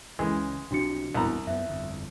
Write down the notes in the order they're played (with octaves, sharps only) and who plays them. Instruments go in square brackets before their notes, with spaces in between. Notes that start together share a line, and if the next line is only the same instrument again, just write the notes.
[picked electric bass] C#2 C#3 [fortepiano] E3 G#3
[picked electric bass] B1 C3 F3 [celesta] D4 F#4 C#7
[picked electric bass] E1 B3 [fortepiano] C2 A#5
[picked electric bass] F#2 B3 [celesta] E5
[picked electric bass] G1 F2